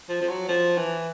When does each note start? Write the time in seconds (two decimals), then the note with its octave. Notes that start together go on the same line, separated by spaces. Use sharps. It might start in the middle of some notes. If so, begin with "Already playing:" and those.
0.09 F3
0.21 F3
0.29 F#3
0.48 F3
0.78 E3